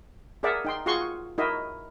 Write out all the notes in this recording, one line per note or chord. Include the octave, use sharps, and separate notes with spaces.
G#4 A#4 D5 E5 F#5
D#4 G5 C6
F4 F#4 G#4 F#5 C6 C#6
D#4 E4 F#4 A#4 D#5 E5